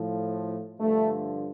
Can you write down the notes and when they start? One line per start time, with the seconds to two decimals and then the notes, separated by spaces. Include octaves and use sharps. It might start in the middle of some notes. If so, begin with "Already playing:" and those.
Already playing: A2 F3
0.80 G2 D3 F3 A3